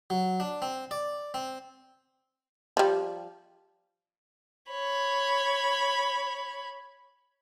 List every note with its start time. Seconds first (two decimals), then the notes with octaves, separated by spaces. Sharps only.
0.10 F#3
0.40 D4
0.62 C4
0.91 D5
1.34 C4
2.77 F3 G3
4.71 C#5 B5